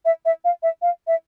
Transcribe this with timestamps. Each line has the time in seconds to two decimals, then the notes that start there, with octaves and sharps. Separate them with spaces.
0.05 E5
0.25 E5
0.45 F5
0.63 E5
0.82 F5
1.07 E5